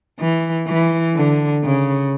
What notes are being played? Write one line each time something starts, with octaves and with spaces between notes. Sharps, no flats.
E3
E3
D3
C#3